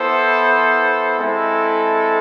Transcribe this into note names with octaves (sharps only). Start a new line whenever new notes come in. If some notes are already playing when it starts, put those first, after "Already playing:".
Already playing: B3 E4 A4 C5
G#3 C4 E4 A4